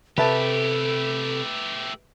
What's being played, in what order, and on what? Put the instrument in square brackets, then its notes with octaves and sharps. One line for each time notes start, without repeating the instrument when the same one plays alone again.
[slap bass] C3 [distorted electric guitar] A3 G4 [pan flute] A4 [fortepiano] B4 E5 A5